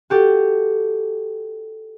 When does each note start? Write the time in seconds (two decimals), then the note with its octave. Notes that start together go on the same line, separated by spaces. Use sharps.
0.10 F#4 G4 A4